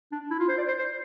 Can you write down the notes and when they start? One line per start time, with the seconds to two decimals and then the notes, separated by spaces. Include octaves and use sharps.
0.12 D4
0.31 E4
0.40 F4
0.49 C5
0.58 D5
0.68 C5
0.79 C5